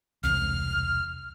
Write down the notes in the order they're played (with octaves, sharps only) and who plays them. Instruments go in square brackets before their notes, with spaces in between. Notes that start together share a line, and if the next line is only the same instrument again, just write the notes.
[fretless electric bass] E1 C2 [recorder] F6